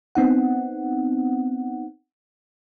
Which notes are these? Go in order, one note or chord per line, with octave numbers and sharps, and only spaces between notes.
B3 C4 D#4 F#5